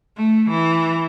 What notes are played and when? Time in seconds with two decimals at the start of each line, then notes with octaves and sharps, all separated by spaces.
0.17 A3
0.51 E3